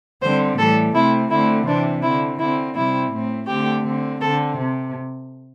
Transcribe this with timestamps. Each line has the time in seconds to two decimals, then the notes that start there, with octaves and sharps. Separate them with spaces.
0.22 D3 G3 C4 C5
0.58 A2 E3 G3 A4
0.94 C3 A3 C4 E4
1.31 D3 A3 C4 E4
1.66 C3 E3 C4 D4
2.03 D3 C4 E4
2.40 D3 C4 E4
2.76 C3 G3 C4 E4
3.11 A2 A3 C4
3.47 D3 A3 C4 G4
3.84 D3 C4
4.21 D3 C4 A4
4.56 C3